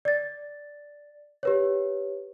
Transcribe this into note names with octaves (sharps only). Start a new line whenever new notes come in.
D5 A6
G4 B4 C#5